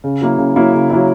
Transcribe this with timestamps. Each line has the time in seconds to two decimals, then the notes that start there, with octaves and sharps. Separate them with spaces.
0.04 C#3
0.22 F#3 A#3 E4
0.38 C#3
0.56 F#3 A#3 E4
0.73 C#3
0.90 F#3 A#3 E4